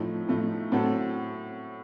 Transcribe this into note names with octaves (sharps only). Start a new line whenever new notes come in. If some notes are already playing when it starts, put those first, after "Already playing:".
Already playing: A2 F3 A3 D#4
A2 F3 A3 D#4
A2 F#3 C4 F#4 A4